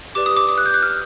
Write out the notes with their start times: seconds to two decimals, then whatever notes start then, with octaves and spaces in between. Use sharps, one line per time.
0.15 G4 B4 D5 D6
0.26 D#6
0.36 D6
0.49 D#6
0.58 F#6
0.66 G6
0.74 F#6
0.83 F6